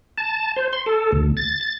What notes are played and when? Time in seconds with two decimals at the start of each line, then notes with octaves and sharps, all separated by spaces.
0.18 A5
0.57 C5
0.73 C6
0.86 A4
1.12 D2
1.37 A6
1.61 A6